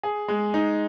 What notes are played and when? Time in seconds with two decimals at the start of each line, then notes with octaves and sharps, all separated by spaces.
0.03 G#4
0.28 G#3
0.54 D#4